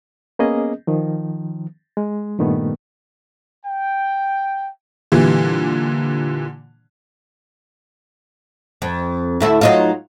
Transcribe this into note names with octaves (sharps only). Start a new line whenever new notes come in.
A#3 B3 C#4 G#4 D#5
D#3 F3
G#3
G2 A#2 D#3 A3 B3
G5
A#2 D3 E3 G3
F2
D2 A3 E4
F#3 D#4 F4